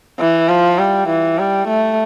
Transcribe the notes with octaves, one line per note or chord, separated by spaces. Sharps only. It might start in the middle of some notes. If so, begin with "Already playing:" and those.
E3
F3
G3
E3
G3
A3